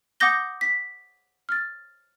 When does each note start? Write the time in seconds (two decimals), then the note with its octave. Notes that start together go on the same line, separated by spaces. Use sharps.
0.20 F#5 D6 D#6 G6 A#6 G7
0.61 B6
1.49 F6 A6